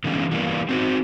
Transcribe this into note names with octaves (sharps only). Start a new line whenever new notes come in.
D3 E3 G#3 A#3 B3 C#4
E3 G3 A#3 B3
C4 D#4 F#4 A4 C5